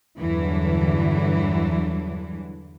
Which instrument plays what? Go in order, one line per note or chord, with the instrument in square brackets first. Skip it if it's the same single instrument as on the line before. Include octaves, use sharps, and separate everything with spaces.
[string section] E2 G2 D3 E3 F#3